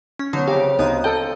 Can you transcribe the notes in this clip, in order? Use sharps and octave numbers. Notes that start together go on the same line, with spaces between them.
C#4
B2 D3 F#3 D#4 C#5 F#5
F2 C#3 G4 F5 D7
D2 B3 D#4 C5 F5 D#6
A4 D#5 G5